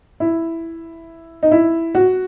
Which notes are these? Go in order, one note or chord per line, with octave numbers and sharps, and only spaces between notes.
E4
D#4
E4
F#4